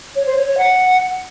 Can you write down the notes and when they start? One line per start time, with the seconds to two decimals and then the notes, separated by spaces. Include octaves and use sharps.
0.16 C#5
0.26 C5
0.37 C#5
0.47 C#5
0.58 F#5